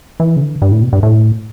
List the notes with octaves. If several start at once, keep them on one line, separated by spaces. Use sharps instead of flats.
E3
C#3
D3
G2
A2
B2
G2
A2